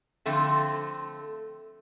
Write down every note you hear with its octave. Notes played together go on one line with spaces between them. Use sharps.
D3 F3 A3 C4 A4